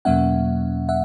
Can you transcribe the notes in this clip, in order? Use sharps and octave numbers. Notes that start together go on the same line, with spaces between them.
E2 B2 F#3 A#3 C#4 E5 F#5
E5 F#5